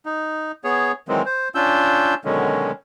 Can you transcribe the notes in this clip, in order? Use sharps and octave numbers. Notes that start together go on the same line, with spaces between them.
D#4
B3 G#4 C#5
D#3 E3 F#3 G#3 C4
C5
C#4 D4 F4 E6 G6
B2 D3 D#3 F#3 G#3 C#4